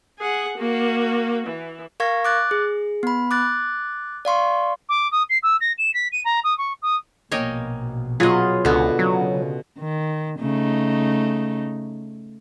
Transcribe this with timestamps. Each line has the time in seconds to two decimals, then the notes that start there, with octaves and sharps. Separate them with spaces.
0.19 G#4 F#5
0.57 A#3 F#4
1.46 E3
2.00 A#4 F5 C#6 G#6 A#6
2.25 D6 F#6 A6
2.51 G#4
3.03 B3 B5
3.31 D6 F#6 A6
4.25 D5 F5 C6 C#6
4.89 D6
5.12 D#6
5.30 C7
5.43 E6
5.61 A#6
5.78 E7
5.94 B6
6.12 D#7
6.25 A#5
6.44 D#6
6.58 C#6
6.82 D#6
7.32 A#1 B2 A#3 C#5 D#5 G5 G#5
8.20 F#3 B3 F4 G#4 D#5
8.65 C#2 B2 D3 B3
8.99 C#3 F#3
9.78 D#3
10.40 C#3 A3 D#4